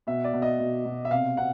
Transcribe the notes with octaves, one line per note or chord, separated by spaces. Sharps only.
B2 E5
D5
B2
D#5
B2
B2
E5
C3 F5
C3 F#5